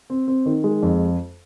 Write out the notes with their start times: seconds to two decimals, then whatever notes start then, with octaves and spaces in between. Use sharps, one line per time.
0.10 C4
0.28 C4
0.46 D#3
0.64 G#3
0.82 F2